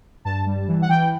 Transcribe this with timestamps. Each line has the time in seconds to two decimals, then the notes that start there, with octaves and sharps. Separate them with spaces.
0.25 G2 A5
0.46 G3
0.68 E3
0.82 F#5
0.89 E3 G5